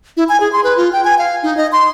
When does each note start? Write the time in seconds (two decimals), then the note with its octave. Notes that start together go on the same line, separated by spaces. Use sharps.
0.17 E4
0.29 G#5
0.40 G#4
0.53 C6
0.64 B4
0.77 F4
0.93 G5
1.04 G#5
1.18 F5
1.43 D#4
1.57 D#5
1.72 C6